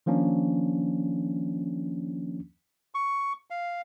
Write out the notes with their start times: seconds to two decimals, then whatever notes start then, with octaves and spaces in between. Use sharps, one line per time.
0.06 D#3 F3 A#3 C#4 D4
2.95 C#6
3.50 F5